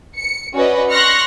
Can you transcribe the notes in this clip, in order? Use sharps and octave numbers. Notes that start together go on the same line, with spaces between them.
C#7
C#4 F#4 B4 D5 D#5
C6 C#6 F6 F#6 A#6 C#7